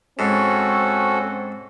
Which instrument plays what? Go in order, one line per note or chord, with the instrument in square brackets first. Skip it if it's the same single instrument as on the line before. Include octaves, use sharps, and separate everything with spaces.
[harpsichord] G#2 [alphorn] C4 [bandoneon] C#4 F#4 A4